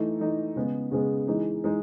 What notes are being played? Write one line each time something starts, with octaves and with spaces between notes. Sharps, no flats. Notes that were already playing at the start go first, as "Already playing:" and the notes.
Already playing: E3 A3 D#4
E3 A3 D#4
C#3 G#3 B3
C#3 G#3 B3
E3 G#3 D#4
E3 G#3 D#4